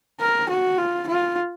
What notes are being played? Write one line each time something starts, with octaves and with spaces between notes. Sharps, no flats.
A#4
F#4
F4
F4